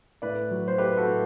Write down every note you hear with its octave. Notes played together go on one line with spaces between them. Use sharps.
A2 B4 D5
F#3
C5
A3 G4 B4
B4
F#4 A4
A2